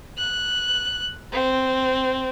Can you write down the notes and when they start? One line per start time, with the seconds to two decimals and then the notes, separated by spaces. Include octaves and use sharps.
0.18 F#6
1.32 C4